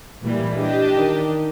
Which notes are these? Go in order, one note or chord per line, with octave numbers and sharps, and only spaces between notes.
A#2 E3 G3
D4 G4 D#5
D#3